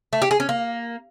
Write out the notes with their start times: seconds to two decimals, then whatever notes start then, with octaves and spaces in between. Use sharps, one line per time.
0.13 A3
0.22 G4
0.31 G#4
0.40 C#4
0.49 A#3